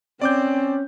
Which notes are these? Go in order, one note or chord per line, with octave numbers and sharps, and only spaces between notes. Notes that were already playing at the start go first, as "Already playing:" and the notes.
C4 C#4 D5 D6 G6